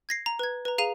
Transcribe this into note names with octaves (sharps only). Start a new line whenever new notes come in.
G#6 A#6 C7
A#5
B4 G#6
B4 A#5
G#4 F5 A#5 D#7 F7